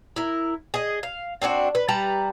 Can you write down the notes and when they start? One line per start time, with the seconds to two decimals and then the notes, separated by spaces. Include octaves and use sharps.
0.16 E4 A#4
0.74 G#4 D#5
1.03 F5
1.42 C4 D4 D#4 F#4
1.75 B4
1.88 G3 B4 A5 A#5